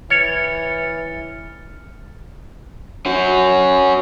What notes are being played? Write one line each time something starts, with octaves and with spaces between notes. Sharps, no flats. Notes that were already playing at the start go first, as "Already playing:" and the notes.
E3 C#5 F6 A6 C#7
C#4 F#4